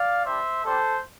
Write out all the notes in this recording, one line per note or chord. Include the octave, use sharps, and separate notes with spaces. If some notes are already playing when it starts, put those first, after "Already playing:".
Already playing: D5 F5
G3 D4 G4 C5 E5
G3 D4 G4 A4 C5